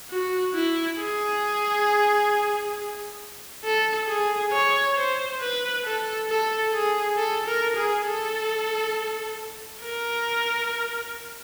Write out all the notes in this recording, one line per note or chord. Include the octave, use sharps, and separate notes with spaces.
F#4
E4
G#4
A4
G#4
C#5
C5
B4
A4
A4
G#4
A4
A#4
G#4
A4
A#4